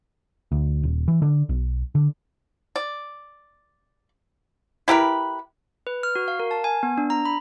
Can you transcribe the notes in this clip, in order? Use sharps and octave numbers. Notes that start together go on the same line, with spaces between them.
D2
D#1
E3
D3
B1
D3
D5
E4 G4 A#4 B4
B4
F6
F#4
F5
A#4
A5
G#5
B3
D4
A#5
B5